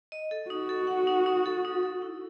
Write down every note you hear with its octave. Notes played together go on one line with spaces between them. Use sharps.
D#5
A4
D#4 F#4
A4
F#5
D#4
D#4
A4
D#4
A4
E4